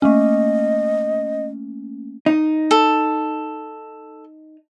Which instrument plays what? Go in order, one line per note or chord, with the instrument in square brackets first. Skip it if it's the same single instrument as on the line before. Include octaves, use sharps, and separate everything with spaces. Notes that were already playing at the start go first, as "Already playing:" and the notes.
[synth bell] A3 A#3 C#4 [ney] D#5
[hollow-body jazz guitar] D#4
[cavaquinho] A4